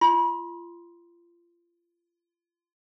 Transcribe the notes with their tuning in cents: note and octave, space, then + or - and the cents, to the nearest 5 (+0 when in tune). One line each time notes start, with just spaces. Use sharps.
F4 -30 C6 -5